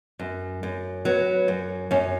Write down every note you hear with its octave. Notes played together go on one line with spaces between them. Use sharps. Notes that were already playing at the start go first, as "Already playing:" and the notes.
F#2
F#2
F#3 B3
F#2
F#2 C#4